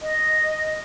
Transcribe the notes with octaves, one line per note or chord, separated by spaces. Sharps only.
D#5